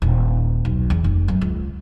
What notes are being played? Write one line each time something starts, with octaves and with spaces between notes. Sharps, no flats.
D#1
B1
E2
F1
F#2
C#2